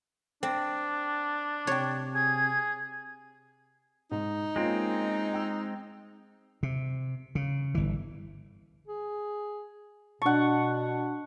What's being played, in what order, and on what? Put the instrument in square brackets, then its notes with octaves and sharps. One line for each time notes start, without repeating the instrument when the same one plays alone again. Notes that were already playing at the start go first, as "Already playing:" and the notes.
[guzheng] C4 [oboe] D4
[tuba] C3 [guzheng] C#5 G5
[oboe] G#4 [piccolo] G#6
[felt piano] G#2 [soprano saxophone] D#4
[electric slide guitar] G#3 C4 [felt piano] A#3 C#4 F4
[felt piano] G5 E6
[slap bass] C3
C#3
G1 E3
[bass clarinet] G#4
[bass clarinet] B2 [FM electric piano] D4 A5 [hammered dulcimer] F#5 C#6